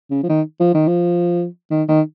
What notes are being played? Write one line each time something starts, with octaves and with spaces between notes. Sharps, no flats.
C#3
F3
D#3
F3
D#3
F3
D#3
D#3